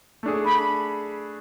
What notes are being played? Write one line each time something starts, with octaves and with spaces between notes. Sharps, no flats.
A3 D4 G#4
B5